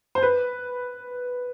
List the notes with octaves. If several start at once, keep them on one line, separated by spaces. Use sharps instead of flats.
C5
B4